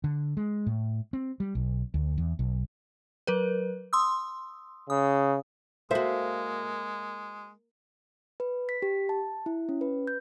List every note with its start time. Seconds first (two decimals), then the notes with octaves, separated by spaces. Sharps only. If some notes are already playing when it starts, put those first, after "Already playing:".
0.04 D3
0.37 G#3
0.66 A2
1.13 C4
1.40 G3
1.55 B1
1.94 D2
2.18 E2
2.39 B1
3.27 F#3 A#4 B4
3.93 C6 D#6 E6
4.90 C#3 D#6
5.91 G#3 A#3 F#4 A4 C5 E5 F5
8.40 B4
8.69 B6
8.82 G4
9.09 A5
9.46 E4
9.69 C#4
9.81 B4
10.07 G6